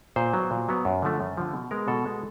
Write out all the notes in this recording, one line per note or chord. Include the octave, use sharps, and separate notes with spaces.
A#2 C5
F#3 B3
A#2
F#3 B3
F#2
D3 F3 A3
F#2
D3 F3 A3
B2
G#3 B3 A#4
B2 A4
G#3 B3